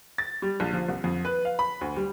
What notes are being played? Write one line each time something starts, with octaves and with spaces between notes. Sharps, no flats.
A6
G3
A#1
F3
C2
F2
B4
F5
B5
D2
G3